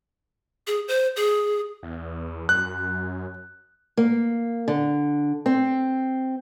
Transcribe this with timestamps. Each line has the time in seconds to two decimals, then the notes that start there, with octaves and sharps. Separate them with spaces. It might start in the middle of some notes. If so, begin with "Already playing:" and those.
0.67 G#4
0.88 C5
1.16 G#4
1.83 E2
2.49 F#2 F#6
3.97 A#3
4.68 D3
5.46 C4